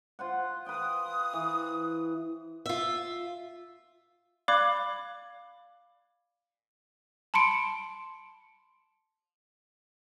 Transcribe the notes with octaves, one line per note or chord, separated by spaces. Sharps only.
F4 C5 F#5
B4 G5 D#6
E3
F4 E5
D5 F5 B5 D6 F#6 G#6
A5 B5 C6 C#7 D7